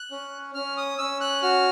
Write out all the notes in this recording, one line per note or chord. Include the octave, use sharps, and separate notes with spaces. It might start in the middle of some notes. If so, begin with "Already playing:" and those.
Already playing: F#6
C#4
C#4 F6
D#6
C#4 E6
F#6
F#4 F6